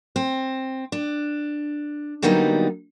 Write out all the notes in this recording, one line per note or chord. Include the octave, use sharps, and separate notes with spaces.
C4
D4
D3 F#3 G3 A#3 B3 D#4